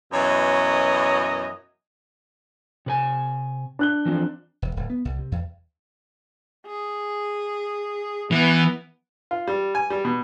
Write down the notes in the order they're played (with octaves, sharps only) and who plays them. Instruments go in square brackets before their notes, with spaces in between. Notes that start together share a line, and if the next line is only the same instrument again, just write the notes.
[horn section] F#2 B2 E3 C#5 D#5
[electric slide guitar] C3 B4 G#5
[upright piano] D4 F#6 G7
[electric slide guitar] E3 F3 C4
[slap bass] E1
D1
B3
C2
C3
E2
[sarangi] G#4
[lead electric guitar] E3 [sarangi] B3
[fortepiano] F4
G3
G#5
G3
B2